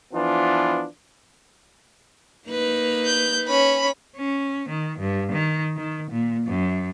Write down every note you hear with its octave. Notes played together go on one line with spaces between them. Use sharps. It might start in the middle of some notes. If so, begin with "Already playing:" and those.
E3 F3 B3 D4 F4
A#3 D#4 B4
G6
C#4 B5
C#4
D#3
G2
D#3
D#3
A#2
F#2